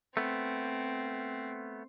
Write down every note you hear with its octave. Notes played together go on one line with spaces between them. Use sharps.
A3 B3 C4